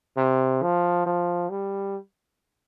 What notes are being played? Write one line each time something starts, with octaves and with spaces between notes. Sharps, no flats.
C3
F3
F3
G3